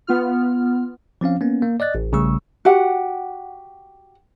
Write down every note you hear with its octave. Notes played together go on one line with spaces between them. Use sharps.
B3 F4 F6
F3 C4 C#4 F5
A#3 B3 C#4
A#3
D5 D#5 F#6 A6
A1
A#1 C#3 G3 A3 C#6 E6
F#4 G4 F#5